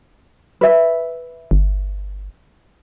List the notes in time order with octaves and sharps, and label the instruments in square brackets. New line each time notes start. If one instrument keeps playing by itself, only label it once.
[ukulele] B4 E5
[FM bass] G1